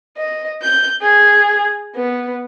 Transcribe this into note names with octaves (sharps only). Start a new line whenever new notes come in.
D#5
G6
G#4
B3